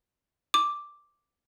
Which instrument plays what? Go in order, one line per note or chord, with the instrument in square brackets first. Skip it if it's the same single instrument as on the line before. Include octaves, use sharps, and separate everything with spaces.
[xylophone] D6